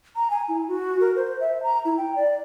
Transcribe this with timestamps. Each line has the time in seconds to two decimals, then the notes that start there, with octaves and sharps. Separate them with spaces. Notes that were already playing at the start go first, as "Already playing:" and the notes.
0.16 A#5
0.30 G#5
0.49 E4
0.68 F#4
1.01 A#4
1.16 C5
1.40 E5
1.63 A#5
1.85 E4
1.98 G5
2.16 D5